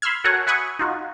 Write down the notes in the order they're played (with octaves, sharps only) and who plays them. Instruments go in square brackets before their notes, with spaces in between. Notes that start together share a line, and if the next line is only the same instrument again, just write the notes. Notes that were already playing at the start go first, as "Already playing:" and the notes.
[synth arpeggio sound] B5 C6 E6 F6 G#6
F#4 A4 A#4 C#5 F#5 G#5
E5 F#5 G#5 B5 C#6 D#6
D#4 F4 F#4